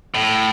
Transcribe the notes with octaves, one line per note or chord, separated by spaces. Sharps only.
A2